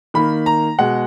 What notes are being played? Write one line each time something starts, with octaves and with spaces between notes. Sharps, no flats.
D#3 A#3 B5
A#5
B2 G#3 F#5